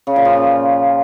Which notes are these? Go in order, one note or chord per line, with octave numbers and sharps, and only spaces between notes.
C#3
A#2
F3